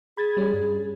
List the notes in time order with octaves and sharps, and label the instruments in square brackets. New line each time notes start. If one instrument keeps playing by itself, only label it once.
[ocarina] G#4 [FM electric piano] B5 G#6 A6
[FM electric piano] G3 C#4
G2